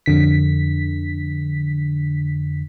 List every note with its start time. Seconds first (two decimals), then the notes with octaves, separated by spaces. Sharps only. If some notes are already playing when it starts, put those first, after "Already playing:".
0.06 F2 D3 B6